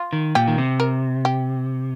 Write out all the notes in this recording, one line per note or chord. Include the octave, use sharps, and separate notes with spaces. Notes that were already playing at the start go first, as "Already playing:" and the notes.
Already playing: F4
D#3
A#2 G4
D#3
C3
A#4
G4